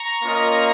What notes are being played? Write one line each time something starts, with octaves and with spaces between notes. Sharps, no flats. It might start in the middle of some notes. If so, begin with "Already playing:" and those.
Already playing: A#5 C#6
A#3 C#4 F4 A#4 D#5